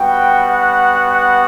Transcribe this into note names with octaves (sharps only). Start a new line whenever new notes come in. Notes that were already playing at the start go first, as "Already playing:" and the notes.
Already playing: G3 B3 F#4 G5
F#5
F#5